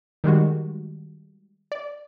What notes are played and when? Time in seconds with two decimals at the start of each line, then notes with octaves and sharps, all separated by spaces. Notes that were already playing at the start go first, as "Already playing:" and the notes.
0.24 D#3 G3 G#3 F#4
1.72 D5